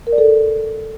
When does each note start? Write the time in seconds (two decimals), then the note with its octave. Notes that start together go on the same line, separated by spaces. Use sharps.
0.07 A#4
0.12 D5
0.18 A4